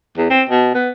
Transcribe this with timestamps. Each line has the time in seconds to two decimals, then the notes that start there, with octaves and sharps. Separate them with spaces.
0.18 E2
0.30 C4
0.49 B2
0.75 B3